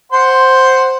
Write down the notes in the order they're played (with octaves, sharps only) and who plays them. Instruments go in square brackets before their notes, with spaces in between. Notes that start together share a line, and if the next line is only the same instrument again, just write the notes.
[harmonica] C5 F#5 C6